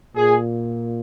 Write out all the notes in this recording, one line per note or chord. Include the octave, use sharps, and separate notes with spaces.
A#2 G#4